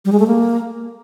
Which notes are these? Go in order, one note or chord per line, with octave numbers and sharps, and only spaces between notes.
G3
G#3
A3
A#3